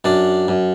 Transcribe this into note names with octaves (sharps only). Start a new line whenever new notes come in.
F#2 D4 D5
F#2